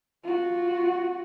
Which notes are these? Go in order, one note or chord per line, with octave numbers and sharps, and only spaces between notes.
F4 F#4